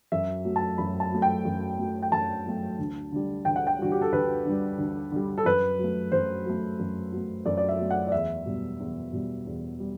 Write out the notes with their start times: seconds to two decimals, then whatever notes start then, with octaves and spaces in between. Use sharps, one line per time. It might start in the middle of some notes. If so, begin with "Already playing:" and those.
0.12 F#2 E5
0.45 F#3 A3
0.56 A5
0.78 F#2 B5
1.00 A5
1.12 F#3 A3
1.22 G5
1.45 F#2
1.78 F#3 A3
2.02 G5
2.12 F#2 A5
2.46 F#3 A3
2.79 D2
3.12 D3 G3
3.45 D2 G5
3.56 F#5
3.67 G5
3.78 D3 G3 F#4
3.92 G4
4.02 A4
4.12 D2 B4
4.45 D3 G3
4.78 D2
5.12 D3 G3
5.38 A4
5.45 F#2 B4
5.79 F#3 A3
6.12 F#2 C5
6.46 F#3 A3
6.79 F#2
7.12 F#3 A3
7.46 F#2 D5
7.57 D5
7.69 E5
7.79 F#3 A3
7.91 F#5
8.07 D5
8.12 E2 E5
8.46 B2 G3
8.80 E2
9.13 B2 G3
9.46 E2
9.80 G3